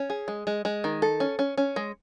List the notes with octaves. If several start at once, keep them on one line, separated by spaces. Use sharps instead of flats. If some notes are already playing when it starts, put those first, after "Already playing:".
Already playing: C#4
G#4
G#3
G#3
G#3
D#3
A4
C#4
C#4
C#4
G#3